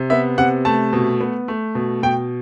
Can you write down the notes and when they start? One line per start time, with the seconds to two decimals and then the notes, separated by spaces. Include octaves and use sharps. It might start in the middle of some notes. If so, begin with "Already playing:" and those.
Already playing: C3
0.10 B3 E5
0.38 C3 F#5
0.65 A3 A5
0.93 B2
1.20 B3
1.48 A3
1.75 B2
2.03 B2 G5